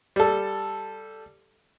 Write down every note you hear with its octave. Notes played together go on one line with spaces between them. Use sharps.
G3 A4